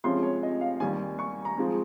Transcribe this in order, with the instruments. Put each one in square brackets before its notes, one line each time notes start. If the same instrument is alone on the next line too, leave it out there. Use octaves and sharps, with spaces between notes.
[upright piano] C3 F3 G#3 C#4 C6
C#5
D#5
F5
D#2 D#3 G3 G#5
C#6
A#5
F3 G#3 C4